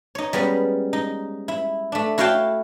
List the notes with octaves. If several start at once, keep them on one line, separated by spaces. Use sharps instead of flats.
D#4 C#5
G3 G#3 B3 C#4
D#4
E4
A3 D4
E4 F#4 C#5 F5 G5 A5